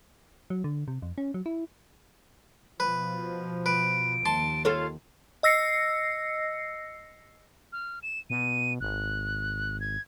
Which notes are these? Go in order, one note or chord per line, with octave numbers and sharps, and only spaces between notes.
F#3
D3
C3
F2
C#4
F#3
E4
B2 F3 B4
B4 D7
D#2 A5 C6
F4 A4 C#5 F6
D#5 E6 A#6 C7 C#7
F6
E7
B2 D#7
G#1 F#6
G#6